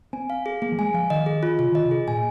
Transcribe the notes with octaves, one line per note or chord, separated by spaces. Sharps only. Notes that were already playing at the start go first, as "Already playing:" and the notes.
C4 G#5
F5
G#4
A#3 G#4
F3
G#3 G#5
F3 F5
D#3 D#5
G#4
F4
C3 F4
D#3 D#5
C3
G#4
A#2 G#5